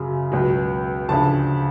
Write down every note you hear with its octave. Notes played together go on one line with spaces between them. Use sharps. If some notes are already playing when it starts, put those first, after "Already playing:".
Already playing: F#2 C#3 F#3
C#2 B2 F#3
D2 C#3 F3 A5